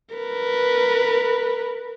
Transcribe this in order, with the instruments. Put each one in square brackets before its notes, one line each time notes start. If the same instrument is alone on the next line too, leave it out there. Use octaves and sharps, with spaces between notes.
[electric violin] A#4 B4